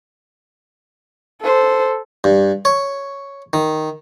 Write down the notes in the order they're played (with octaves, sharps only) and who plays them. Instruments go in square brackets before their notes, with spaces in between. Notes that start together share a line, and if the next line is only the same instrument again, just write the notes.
[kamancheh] A4 C5
[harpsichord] G2
C#5
D#3